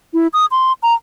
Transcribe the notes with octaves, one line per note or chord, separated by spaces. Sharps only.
E4
D#6
C6
A#5